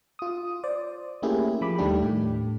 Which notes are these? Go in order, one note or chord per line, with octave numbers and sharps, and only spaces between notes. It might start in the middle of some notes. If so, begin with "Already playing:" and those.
F4 D#6
C5 D5
A3 A#3 C#4 E4 G4 G#4
F3 B5 D6
D#2 D#3 G3 A3 D4 G4
A2